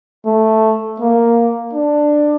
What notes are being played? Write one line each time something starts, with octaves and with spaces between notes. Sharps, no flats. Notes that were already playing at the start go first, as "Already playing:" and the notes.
A3
A#3
D4